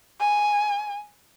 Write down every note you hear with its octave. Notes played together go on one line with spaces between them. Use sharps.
G#5